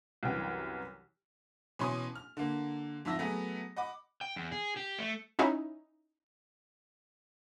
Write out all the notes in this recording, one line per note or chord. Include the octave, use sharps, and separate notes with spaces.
C2 F#2 E3 G5
B2 E3 C#4 C6 D6 D#6
F6
D3 A#3
F2 G#2 F4 E5 E6 A#6
F#3 A3 B3 G#4
D#5 F#5 B5 D6
G5
E2
G#4
G4
A3
C#4 D#4 E4